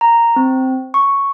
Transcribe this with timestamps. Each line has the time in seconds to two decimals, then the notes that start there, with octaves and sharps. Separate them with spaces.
0.01 A#5
0.36 C4
0.94 C#6